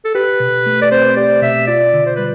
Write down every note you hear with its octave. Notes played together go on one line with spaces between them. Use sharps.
A4
G4 B4
B2
A3
D5
C4 C5
G4 D5
B2 E5
F4 D5
D3
C5
G3 B4